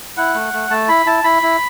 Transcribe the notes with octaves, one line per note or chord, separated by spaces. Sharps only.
E4 F#5
A3
A3
A3 A5
E4 B5
E4 A5
E4 B5
E4